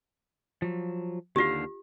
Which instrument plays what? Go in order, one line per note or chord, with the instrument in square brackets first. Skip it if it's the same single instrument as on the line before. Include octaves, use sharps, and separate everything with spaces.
[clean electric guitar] F3 F#3
[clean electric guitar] D#2 D3 F5 [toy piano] F4 G4